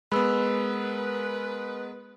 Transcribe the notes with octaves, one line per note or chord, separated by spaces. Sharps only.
G#3 B3 A#4 B4 B5 E6